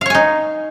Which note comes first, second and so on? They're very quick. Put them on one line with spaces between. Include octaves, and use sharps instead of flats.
F5 C#5 G#5 D#4